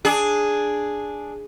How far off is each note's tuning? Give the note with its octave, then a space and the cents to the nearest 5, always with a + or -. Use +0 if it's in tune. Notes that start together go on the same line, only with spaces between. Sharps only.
D4 +0 G#4 +0